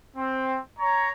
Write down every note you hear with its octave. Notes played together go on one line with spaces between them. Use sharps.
C4
C#5 A#5